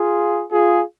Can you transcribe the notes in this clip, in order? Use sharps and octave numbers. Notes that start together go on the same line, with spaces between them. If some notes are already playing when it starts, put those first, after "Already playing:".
Already playing: F4 G#4
F4 G#4